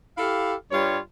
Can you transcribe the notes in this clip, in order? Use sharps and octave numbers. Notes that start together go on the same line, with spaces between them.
E4 G4 A4 F5
G2 G3 F4 C#5